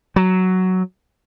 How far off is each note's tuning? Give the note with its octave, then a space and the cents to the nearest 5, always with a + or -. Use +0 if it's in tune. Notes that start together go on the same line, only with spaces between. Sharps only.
F#3 +5